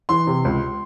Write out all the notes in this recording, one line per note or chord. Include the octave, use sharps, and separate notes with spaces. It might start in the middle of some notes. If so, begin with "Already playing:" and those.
E3 C6
C3
C#2